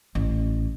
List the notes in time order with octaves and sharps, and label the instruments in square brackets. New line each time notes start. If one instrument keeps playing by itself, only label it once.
[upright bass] A1